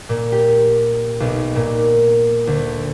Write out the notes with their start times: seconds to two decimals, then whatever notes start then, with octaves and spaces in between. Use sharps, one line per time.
0.09 A#2
0.32 G4
1.20 B1
1.56 A#2
2.47 D2